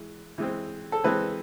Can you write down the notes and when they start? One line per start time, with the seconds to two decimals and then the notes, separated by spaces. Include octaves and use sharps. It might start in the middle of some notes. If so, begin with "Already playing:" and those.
Already playing: E3 G#3
0.38 E3 G#3 C4
0.92 A4
1.04 E3 G#3 C4 B4